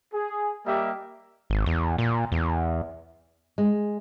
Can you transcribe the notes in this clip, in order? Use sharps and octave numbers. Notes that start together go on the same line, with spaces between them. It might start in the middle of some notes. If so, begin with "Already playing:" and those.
G#4
G3 A#3 G4 D#5 E5
G#1
E2
A#2
E2
G#3